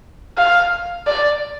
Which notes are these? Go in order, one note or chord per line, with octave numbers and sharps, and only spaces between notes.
F5
D5